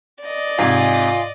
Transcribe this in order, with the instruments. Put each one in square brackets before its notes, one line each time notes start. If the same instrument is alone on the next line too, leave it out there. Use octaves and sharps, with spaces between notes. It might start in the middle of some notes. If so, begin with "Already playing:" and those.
[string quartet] D5 D#5
[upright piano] G#2 C3 [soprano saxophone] F4 [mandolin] G#5